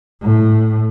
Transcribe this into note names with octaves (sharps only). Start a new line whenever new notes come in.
A2